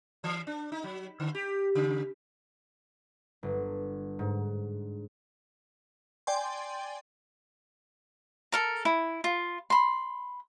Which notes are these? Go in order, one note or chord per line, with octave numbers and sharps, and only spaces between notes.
E3
D4
D#4
F#3
D3
G4
C#3
G1
G#2
D5 G5 G#5 C6
A4 A#4 A#5
E4
F4
B5 C6